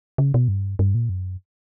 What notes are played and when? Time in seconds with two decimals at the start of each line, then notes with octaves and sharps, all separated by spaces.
0.18 C#3
0.34 B2
0.48 G2
0.79 G2
0.95 A#2
1.09 F#2